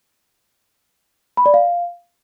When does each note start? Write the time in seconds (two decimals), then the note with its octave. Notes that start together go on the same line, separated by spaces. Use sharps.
1.37 B5
1.46 D5
1.54 F5